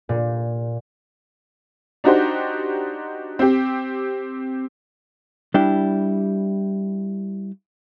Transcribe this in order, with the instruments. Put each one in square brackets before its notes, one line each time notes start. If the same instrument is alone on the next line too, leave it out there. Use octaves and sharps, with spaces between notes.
[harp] A#2
[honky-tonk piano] D4 D#4 F#4 G4 C5
C4 G4
[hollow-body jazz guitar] G3 D4 E4 G4